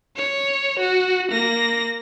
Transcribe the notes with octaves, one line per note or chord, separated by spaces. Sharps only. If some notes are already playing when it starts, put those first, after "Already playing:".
C#5
F#4
A#3 A#6